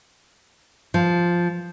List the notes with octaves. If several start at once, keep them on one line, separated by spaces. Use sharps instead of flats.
F3